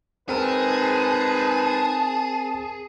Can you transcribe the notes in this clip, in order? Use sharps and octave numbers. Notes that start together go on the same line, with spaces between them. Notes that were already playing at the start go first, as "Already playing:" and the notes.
G#3 C4 D#4 G#4 A#4 B4 A5